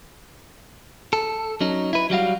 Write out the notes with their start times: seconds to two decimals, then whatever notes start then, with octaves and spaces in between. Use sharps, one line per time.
1.13 A4
1.60 F#3 C#4 D#4
1.93 E4 B4
2.10 F#3 G3 F#4 F5